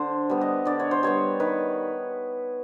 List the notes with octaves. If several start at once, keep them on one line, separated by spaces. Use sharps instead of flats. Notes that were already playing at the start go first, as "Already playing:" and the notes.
Already playing: D3 C5
G3 B3
D#5
D3 D5
C#5
C5
G3 B3 C#5
D#3 B4